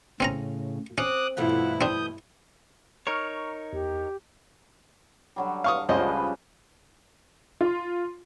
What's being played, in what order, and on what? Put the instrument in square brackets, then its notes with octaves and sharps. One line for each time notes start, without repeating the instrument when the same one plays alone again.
[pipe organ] A2 C#3 [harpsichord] C4 C#4 A#5
[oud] C4 [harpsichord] C#4 [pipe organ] D6 D#6 F#6
[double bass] G2 E4 [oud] B2 E3 A3 [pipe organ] F4 F#5
[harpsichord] C4 D4 [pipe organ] D#6 G6
[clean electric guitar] D#4 A#4 C#5 [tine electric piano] A#5 C#6 F6
[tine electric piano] E2 [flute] G4
[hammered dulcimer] D3 F#3 G3
[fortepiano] F5 C#6 D#6
[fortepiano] C#2 C5 D#5 [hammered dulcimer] C#3 F3 G3
[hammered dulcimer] B4
[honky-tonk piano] F4 C6